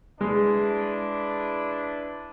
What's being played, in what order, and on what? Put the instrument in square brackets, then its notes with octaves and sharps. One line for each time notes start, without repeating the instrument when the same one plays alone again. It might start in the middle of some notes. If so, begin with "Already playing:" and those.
[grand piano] G#3 [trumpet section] D4 E4 B4